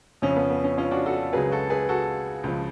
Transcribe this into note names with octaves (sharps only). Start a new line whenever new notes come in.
F2 C#3 F3 C#4
B3
B3
C#4
C#4 F4
D4 F#4
F#4 A4
C#2 C#3 F#3 G#4 B4
F#4 A4
G#4 B4
F#4 A4
C#2 C#3 F3